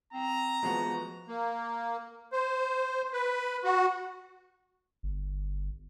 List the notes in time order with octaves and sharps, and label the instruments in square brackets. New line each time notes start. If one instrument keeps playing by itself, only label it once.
[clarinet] C4 [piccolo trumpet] A#5
[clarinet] E3 [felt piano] F3 B3 [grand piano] G#3 A3 F#4
[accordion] A#3
C5
B4
F#4
[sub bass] G1